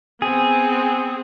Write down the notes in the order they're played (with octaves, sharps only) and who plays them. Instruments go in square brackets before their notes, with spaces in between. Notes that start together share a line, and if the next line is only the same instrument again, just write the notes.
[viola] B3 C4 [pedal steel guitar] G#4